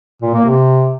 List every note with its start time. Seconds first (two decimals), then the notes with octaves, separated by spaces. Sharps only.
0.22 A#2
0.34 A#3
0.45 C3